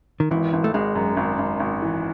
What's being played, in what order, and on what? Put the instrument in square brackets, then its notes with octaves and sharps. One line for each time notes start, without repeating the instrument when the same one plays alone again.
[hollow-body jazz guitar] D#3
[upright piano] G#1 [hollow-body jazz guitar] E3
[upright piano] G#1
[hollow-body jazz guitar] A3
[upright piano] G#1 [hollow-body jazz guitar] G#3
[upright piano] F#2
G#1
G#1
G#1
E3